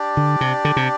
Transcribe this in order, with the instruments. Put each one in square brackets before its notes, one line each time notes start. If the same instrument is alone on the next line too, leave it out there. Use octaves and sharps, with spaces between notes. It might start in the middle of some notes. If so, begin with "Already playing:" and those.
Already playing: [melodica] D4 G4 D5
[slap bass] D3
C3
D3
C3